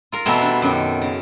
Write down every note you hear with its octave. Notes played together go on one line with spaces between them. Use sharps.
F4 A#4
B2 E3 G3 A3 C4
D4
F#2 D#3
C#3